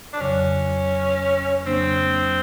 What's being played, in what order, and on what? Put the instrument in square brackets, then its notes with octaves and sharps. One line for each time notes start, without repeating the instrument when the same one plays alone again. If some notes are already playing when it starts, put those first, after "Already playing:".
[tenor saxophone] D4
[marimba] F2 C#3 F#3 [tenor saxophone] C#4
[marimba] F2 C#3 F#3 A#3 D4 [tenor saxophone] C4